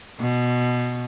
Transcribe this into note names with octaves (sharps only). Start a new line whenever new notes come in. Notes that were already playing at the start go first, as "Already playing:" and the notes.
B2